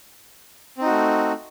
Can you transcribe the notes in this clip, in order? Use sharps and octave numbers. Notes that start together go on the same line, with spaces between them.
A3 C4 D#4 F#4